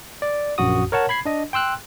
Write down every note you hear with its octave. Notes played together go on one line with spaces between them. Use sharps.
D5
A#1 F#2 F#4 D#6
A#4 C#5 F#5 A5
B5 G#6 C7
D4 D#5
G5 C6 E6 F#6